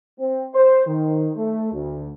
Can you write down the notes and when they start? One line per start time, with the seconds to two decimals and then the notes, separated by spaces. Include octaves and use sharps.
0.19 C4
0.54 C5
0.87 D#3
1.36 A3
1.72 D2